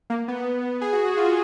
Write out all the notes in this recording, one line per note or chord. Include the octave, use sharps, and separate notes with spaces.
A#3
B3
G#4
F#4
F#4
F4